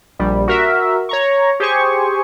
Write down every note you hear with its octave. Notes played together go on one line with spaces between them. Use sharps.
A#1 G3
F#4 A#4 E5
C#5 A#5 C#6
G4 G#4 C5 G#5 C#6